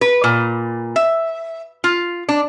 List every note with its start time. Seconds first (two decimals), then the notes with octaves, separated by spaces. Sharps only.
0.01 B4
0.24 A#2
0.96 E5
1.84 F4
2.29 D4